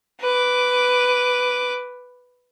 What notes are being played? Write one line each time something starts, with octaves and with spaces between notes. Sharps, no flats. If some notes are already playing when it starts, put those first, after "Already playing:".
B4 D6